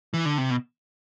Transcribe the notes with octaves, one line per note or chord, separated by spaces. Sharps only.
E3
D3
C3
B2